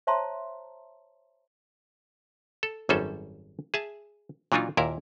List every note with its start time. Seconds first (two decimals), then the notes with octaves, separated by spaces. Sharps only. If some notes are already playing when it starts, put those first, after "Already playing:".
0.07 C5 C#5 E5 A5 A#5 C6
2.63 A4
2.89 G#1 F#2 G3 C#4 A4 C5
3.74 G#4 E5 A5
4.52 A#2 E3 F#3 D4 D#4 F4
4.77 D#2 A#2 E4 A#4